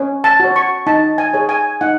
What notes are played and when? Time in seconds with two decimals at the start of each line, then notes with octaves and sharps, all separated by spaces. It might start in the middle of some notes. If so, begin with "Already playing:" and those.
Already playing: C#4
0.24 A5
0.40 F#4 C#5
0.56 C#6
0.87 D#4 A5
1.18 G#5
1.34 G#4 C#5
1.49 G#5
1.81 D#4 F#5